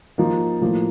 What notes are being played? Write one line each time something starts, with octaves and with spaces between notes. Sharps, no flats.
F3 A#3 D#4
A2 F3 A#3